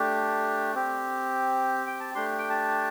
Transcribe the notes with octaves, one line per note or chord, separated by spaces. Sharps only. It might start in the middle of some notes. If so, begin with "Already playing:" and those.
Already playing: A3 D4 G4
C4 G4
G5
A5
A3 D4 G4 C6
G5
A5